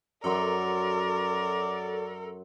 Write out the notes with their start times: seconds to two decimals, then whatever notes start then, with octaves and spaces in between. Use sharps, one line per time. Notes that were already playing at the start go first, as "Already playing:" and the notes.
0.24 F#2 F#3 A4 A#4 D5 C6